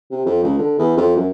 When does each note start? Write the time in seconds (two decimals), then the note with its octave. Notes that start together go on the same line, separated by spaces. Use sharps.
0.11 C3
0.26 F2
0.43 C#2
0.58 D3
0.78 E2
0.97 F2
1.16 F#2